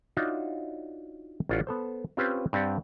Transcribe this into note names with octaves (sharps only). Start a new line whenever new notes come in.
D4 D#4 F4 F#4 C#5 E5
A1 C#4 F4 D5 F#5
B3 A4 C5
C4 C#4 F4 G4 B4 C5
G2 C4 G4 D5 F#5